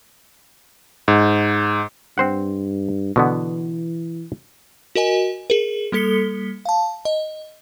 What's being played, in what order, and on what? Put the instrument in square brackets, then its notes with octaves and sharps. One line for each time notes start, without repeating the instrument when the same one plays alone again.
[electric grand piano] G#2
[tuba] G2 [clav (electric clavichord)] C4 C5 F#5
[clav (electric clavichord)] B2 D3 B3 [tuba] E3
[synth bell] F#4 A#4 D#5 G#5
G#4 A#4
G3 A#3 A4 B6 C#7 G7
F5 A5
D#5